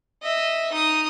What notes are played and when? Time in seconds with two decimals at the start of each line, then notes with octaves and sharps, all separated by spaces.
0.22 D#5 E5
0.72 D#4 D#6